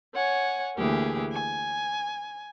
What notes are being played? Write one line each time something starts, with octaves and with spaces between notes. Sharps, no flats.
C#5 F#5 G#5
D2 E3 A#3 G4 G#4
G#5